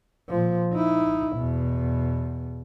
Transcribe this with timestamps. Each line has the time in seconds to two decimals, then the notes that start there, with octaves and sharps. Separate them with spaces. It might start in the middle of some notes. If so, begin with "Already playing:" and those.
0.29 A#2 F3
0.73 D#4 E4
1.36 E2 B2